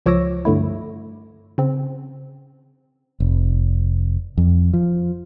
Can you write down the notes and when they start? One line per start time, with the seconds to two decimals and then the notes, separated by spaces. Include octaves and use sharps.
0.06 C#2 F3 C#5 D6 E6 A#6
0.45 G2 D3 A3 E4
1.58 C#3 C4
3.20 F1
4.38 F2
4.73 F3